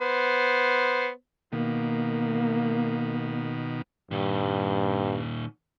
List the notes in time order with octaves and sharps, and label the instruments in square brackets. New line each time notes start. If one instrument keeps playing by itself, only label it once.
[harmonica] B3 C5
[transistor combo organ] B2 D#3 [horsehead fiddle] A#3
[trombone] G2 [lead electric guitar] A#2 D#3